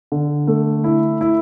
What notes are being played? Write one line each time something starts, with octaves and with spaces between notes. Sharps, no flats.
D3
A3
E4
E4